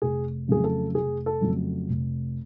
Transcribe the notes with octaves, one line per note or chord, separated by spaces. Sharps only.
F1 G#4
F2 C#3 F#3 A3 G#4
A4
F1 G#4
A4
F2 C#3 F#3 A3
F1